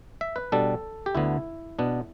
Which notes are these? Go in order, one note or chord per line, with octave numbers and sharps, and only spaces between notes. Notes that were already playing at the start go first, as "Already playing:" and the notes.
E5
B4
B2 G3 D4 A4
G4
D2 D3 B3 E4
B2 B3 D4